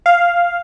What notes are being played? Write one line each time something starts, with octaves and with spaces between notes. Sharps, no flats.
F5